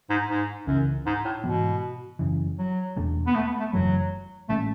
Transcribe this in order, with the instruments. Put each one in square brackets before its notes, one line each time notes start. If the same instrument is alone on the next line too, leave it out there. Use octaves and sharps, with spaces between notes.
[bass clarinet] G#2
G#2
[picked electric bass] C#2 C#3 E3 [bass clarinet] F#2
[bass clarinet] G#2
A2
[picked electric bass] G#2 E3 B3 [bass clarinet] B2
[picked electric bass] F#1 F#2 C#3 E3
[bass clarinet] F#3
[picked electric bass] E2 B2 A3 D4
[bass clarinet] B3
A3
B3
A3
[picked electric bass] F#1 F#2 E3 A3 [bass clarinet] F#3
[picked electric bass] A1 A2 G#3 C#4 [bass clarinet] A3